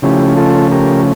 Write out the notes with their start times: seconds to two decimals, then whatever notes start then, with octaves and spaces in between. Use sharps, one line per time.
0.02 C#3 F3 A3 C#4 E4 G4
0.37 F4 A4
0.71 G4 A#4